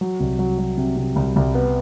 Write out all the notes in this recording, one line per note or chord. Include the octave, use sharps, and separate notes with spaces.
F#3
C2
F#3
F#3
C3
C3
C2
C2
B3